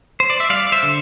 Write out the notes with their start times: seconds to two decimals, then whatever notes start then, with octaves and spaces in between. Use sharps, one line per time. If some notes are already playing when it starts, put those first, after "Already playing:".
0.20 C5
0.30 D5
0.40 E5
0.50 G3 D5 F5
0.72 C5 E5
0.83 D3